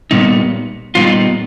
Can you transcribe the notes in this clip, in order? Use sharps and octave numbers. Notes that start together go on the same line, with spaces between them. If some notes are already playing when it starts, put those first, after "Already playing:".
A#2 G3 B3 D#4
A#2 G3 B3 D#4 F4